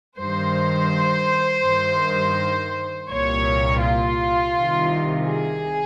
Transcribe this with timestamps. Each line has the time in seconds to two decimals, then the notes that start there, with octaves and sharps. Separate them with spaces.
0.18 G2 D#3 C5
1.63 G2 D#3
3.09 C2 A#2 C#5
3.82 F4
4.55 C2 C3 D#3
5.27 G#4